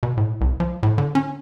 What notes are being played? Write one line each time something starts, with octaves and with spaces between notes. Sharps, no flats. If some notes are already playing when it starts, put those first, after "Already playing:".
B2
A2
C2
F3
A2
D3
C#4